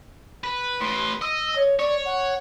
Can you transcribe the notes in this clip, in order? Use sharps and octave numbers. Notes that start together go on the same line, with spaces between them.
B4
A2 B4 C6
D#5 E6
C#5
C#5 D5
F#5